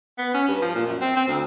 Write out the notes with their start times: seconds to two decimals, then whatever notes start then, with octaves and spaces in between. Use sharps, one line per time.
0.18 B3
0.34 C#4
0.48 G2
0.62 F3
0.75 A#2
0.86 F#2
1.01 C4
1.17 C4
1.28 D2